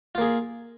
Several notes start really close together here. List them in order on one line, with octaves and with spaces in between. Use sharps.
F4 A#3 G#4